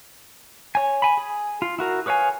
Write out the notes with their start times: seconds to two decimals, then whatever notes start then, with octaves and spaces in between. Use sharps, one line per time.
0.75 C#5 G#5
1.02 G#5 B5
1.17 G#4
1.62 F4
1.79 E4 F#4 A#4
2.06 G#4 B4 C#5 F5 G#5